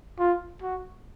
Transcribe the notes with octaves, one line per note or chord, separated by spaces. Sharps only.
F4
F#4